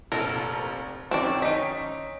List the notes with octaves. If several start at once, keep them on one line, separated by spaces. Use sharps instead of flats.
F1 A#1 A4 A#4
F#2 D#3 C4 C#4 D5
C#4 D#4 B6 D7